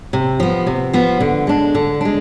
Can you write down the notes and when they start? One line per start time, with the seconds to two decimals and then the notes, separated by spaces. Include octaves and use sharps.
0.13 C3
0.40 F3 B3
0.67 C3
0.93 F3 B3
1.20 D3
1.47 G#3 D4
1.75 D3
2.01 G#3 D4